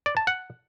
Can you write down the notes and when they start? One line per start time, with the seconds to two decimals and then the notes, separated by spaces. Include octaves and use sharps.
0.06 D5
0.17 A5
0.27 F#5